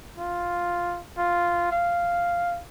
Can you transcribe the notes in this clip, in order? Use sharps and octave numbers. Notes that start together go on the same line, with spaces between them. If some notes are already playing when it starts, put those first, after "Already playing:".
F4
F4
F5